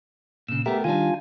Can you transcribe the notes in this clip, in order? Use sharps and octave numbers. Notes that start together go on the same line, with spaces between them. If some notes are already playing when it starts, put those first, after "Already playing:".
A#2 C#3 E6
A3 B3 G4 A#4 E5
D#3 G3 D4 F4 G#5